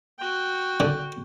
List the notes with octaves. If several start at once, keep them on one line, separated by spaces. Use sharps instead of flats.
F#4 G5
D3